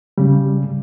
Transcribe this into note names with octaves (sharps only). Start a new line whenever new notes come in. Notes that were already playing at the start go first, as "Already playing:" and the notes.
C#3 G3